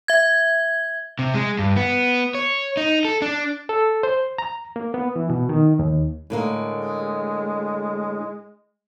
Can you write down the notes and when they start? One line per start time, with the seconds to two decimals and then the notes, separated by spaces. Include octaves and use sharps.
0.08 E5 G#6
1.19 C3
1.34 G#3
1.59 G2
1.77 B3
2.35 C#5
2.77 D#4
3.05 A4
3.22 D4
3.69 A4
4.03 C5
4.38 A#5
4.76 A#3
4.94 B3
5.16 E3
5.30 B2
5.49 D#3
5.79 D#2
6.30 A2 D3 G#3 A#3